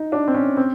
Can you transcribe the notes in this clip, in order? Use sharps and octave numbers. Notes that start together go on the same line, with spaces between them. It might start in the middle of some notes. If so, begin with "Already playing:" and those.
Already playing: D#4
D4
C4
C#4
C4